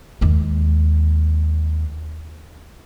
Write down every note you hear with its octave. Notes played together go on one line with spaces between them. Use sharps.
D#2 G#3